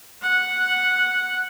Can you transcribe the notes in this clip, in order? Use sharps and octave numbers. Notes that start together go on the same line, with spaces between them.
F#5